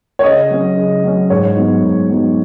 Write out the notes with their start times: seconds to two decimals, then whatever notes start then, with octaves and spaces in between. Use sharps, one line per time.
0.19 C#5
0.24 C#3 D#5
0.51 F#3 C#4
0.77 C#3
1.04 F#3 C#4
1.30 G#2 C#5
1.57 F#3 B3 D#4
1.83 G#2
2.10 F#3 B3 D#4